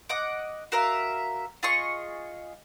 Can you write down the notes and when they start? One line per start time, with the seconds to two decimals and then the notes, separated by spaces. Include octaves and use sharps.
0.09 D#5 F#5 D6
0.72 F#4 A#4 E5 F5
1.63 F4 G#4 D#5 C#6